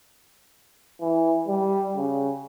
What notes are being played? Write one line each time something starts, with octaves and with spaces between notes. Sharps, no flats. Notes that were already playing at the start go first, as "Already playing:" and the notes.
E3
G3
C#3